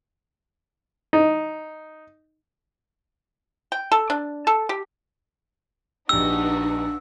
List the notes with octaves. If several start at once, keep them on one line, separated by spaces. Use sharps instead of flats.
D#4
G5
A4
D4
A4
G4
A#1 D4 D#4 F#4 G4 B4 E6